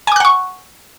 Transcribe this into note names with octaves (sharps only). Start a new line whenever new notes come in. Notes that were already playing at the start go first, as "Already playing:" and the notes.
F#5 G#5 C#6 D6 F#6